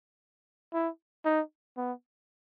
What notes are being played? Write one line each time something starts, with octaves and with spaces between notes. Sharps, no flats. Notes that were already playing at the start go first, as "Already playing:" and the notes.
E4
D#4
B3